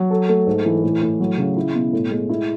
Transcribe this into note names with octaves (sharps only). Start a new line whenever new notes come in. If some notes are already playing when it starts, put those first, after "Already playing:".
Already playing: F#3
A4
A3
G#2
E3
A2
A2
F#3
C#3
E4
B2
A2
G#3
E4